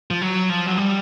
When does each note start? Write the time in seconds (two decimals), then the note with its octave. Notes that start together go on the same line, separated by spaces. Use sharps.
0.11 F3
0.22 F#3
0.49 F3
0.67 F#3
0.78 G3